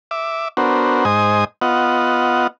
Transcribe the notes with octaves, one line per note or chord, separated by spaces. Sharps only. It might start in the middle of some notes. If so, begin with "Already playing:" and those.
E5 D6
B3 D4 F#4 A#4 C5
G#2 C5 D#5 G#5 D#6
B3 F4 D#5 F#5